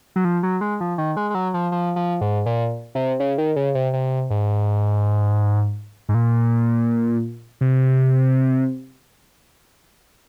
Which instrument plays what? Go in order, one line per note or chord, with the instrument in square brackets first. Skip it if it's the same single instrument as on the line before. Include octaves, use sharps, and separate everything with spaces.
[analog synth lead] F#3
F3
F#3
G#3
F3
D#3
G#3
G#3
F#3
F3
F3
F3
G#2
A#2
C3
C#3
D#3
C#3
C3
C3
G#2
G#2
A#2
C3